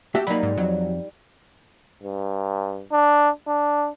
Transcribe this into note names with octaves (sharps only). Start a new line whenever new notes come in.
A3 F#4 G4 E5
F#3 G3 A#3 D#4 B5
G#2
F2 F#3
G2
D4
D4